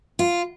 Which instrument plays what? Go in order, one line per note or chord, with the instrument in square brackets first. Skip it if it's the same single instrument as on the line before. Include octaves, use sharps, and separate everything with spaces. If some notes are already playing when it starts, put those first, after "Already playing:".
[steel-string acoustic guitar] F4